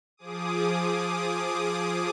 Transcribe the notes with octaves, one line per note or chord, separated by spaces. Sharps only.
F3 G#4 D6 D#6